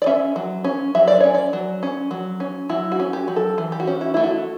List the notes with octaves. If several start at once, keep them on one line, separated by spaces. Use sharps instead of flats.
D5
C#4 E5
F#3
C#4
F#3 E5
D5
C#4 C#5
D5
F#3
C#4
F#3
C#4
F#3 E4
F#4
C#4
G4
F#3
A4
E3
G4
F#4
C#4
E4
A3 E4
F#4